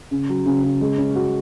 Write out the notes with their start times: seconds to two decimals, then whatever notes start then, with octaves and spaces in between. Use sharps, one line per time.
0.11 C#3
0.29 F#3
0.46 C#3
0.63 C#3
0.81 G#3
0.98 C#4
1.15 F#4